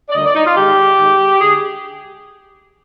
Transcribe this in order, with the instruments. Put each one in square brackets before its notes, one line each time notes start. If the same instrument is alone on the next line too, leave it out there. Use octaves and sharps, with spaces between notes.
[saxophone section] D5
D2 D3 G3 A#3 D#5
D5
D#4
F4
G#2 D#3 G#3 G4
G#2 D#3 G#3
D3 G#3 G#4